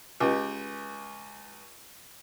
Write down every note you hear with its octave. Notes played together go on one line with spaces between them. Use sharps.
C#2 C#3 G4